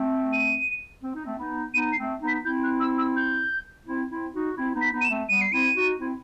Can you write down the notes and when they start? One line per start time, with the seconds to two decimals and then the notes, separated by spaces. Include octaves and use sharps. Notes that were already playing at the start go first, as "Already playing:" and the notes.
Already playing: A3 C4
0.33 D#7
1.03 C4
1.15 D#4
1.25 A3 C4
1.39 B3 D#4
1.74 B3 D#4 D#7
1.93 C7
1.98 A3 C4
2.21 B3 D#4
2.28 B6
2.45 C4 E4 G6
2.64 F#6
2.80 E6
2.98 E6
3.16 G6
3.87 C4 E4
4.10 C4 E4
4.34 D#4 F#4
4.57 C4 E4
4.75 B3 D#4
4.81 B6
4.93 B3 D#4
5.01 D#7
5.05 E7
5.10 A3 C4
5.28 G3 B3 D#7
5.41 C7
5.52 C4 E4 D#7
5.76 D#4 F#4
6.00 C4 E4